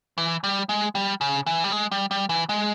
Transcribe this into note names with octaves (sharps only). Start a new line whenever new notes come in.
E3
G3
G#3
G3
C#3
E3
G3
G#3
G3
G3
E3
G#3